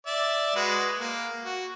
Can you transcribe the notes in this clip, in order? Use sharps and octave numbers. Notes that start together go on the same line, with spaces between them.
D5 E5
G#3 F#4 B4
A#3
F#4